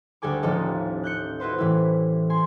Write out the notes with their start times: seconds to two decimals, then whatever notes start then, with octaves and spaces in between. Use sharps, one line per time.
0.22 D2 G3 A4 G#5 D6
0.42 D#1 A1 D#2 F3 A4 D#5
1.04 F#6 G6 C#7
1.40 E4 F#4 B4 C5
1.58 A2 E3 G3 E4
2.30 G#5 C6